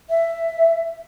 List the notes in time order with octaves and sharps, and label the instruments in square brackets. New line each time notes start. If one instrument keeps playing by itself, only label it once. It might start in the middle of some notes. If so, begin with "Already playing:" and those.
[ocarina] E5